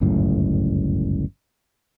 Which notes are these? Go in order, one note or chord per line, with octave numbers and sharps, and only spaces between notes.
G1 C#2 F#2 A2